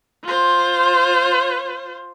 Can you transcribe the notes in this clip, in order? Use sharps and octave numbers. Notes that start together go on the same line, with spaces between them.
F4 C5